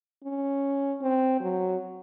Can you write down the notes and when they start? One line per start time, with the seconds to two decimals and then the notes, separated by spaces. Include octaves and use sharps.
0.24 C#4
1.01 C4
1.40 F#3